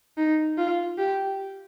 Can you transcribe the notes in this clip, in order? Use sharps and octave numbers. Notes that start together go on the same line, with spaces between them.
D#4
F4
G4